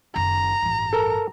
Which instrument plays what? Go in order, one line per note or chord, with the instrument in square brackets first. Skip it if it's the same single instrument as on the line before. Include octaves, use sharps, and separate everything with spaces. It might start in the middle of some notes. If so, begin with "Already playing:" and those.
[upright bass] F#1 D#3 [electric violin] A#5
[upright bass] A1 G2
[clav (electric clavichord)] A4 A#4